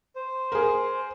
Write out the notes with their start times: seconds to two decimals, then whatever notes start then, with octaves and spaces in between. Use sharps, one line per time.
0.16 C5
0.52 G#4 A#4